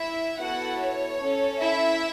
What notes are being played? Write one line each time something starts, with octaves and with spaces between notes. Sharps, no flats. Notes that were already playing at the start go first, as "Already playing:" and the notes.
Already playing: E4 E5
B3 E4 F#4 A4 F#5
C#5
C#4 A4
E4 E5